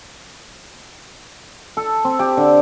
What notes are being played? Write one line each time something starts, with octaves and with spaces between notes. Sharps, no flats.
A4
C4
G4
D3